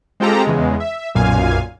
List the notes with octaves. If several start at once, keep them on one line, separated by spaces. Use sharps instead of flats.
G#3 C4 F4 G4 A4 A#5
E2 C#3 G#3
E5
B1 F#2 A#2 F5 G#5